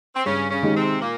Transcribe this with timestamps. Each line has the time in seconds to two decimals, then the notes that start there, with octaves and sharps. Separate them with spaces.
0.15 C4
0.25 G2 C#3 C#4
0.51 C#3 C#4
0.63 D#3 G#3 D#4 G4
0.76 C3 C4
1.02 A#2 A#3